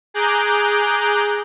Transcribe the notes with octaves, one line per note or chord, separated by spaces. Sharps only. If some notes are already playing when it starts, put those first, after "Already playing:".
G#4 A#5 D6 F#6 G6